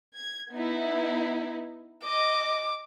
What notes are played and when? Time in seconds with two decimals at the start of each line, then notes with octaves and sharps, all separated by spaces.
0.15 G#6
0.52 B3 D#4 E4
2.04 D#5 D6